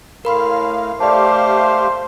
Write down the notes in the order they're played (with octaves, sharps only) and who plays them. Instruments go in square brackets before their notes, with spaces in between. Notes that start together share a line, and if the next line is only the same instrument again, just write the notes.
[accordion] A2 F5 [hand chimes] A#4 B5 C6
[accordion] A3 G4 F5 [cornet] C5 [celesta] D5 A5